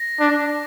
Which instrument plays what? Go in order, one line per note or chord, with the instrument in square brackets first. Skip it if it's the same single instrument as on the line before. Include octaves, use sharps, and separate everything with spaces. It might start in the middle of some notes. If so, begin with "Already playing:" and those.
Already playing: [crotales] A#6
[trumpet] D4